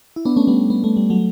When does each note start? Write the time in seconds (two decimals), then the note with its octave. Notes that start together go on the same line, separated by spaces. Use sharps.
0.16 E4
0.25 B3 D4
0.36 A3 C#4
0.47 G3 B3
0.70 B3
0.84 A3
0.97 G3
1.10 F#3 A3